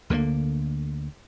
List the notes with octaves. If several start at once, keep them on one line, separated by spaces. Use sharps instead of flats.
D2 D3 D#3 A#3